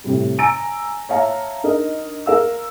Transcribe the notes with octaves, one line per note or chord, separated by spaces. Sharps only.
A2 C3 G3
G#5 A#5 E6 A6 D7
C#5 E5 F5 A5 A#5
D4 D#4 A#4 D#5
A#4 F5 E6